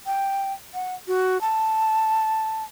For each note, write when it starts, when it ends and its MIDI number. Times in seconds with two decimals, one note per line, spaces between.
0.06 0.53 79
0.74 0.95 78
1.08 1.41 66
1.41 2.63 81